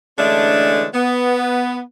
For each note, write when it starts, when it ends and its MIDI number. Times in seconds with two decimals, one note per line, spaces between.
0.19 0.87 50
0.19 0.87 52
0.19 0.87 56
0.19 0.87 57
0.19 0.87 61
0.19 0.87 62
0.94 1.81 59